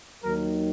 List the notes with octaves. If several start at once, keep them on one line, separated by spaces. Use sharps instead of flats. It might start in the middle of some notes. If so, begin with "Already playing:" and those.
D#2 D#3 F#3 A#4